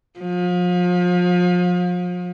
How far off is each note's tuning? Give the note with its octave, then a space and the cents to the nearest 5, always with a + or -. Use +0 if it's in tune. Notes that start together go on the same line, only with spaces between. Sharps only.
F3 +35